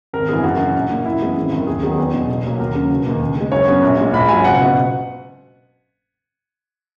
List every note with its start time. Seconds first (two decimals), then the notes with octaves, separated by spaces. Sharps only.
0.13 G#1 A#4
0.29 F#2 E3 B3 G#4
0.44 F#2 F#4
0.59 C#3 E3
0.75 A#1
0.90 A#2 A#3
1.06 F#2 E4
1.21 E3 G#3 B3
1.37 G#1
1.52 F#2 D#3
1.67 D#2 G#4
1.83 D#3 F#3 B3 G#4
1.98 E2
2.13 B2 F#3
2.28 B1
2.44 A#2 F#3 A#3
2.59 D#2 A#4
2.75 C#3 F#3
2.90 E1
3.06 D#2 D#3 A#3
3.21 C#2
3.36 C#3 G#3
3.52 F#2 C#5
3.67 C#3 F#3 B3
3.83 A#1
3.98 A#2 G#3
4.13 A#1 B5
4.29 G#2 F#3 G#5
4.44 F#1 F#5
4.54 F#5
4.61 B2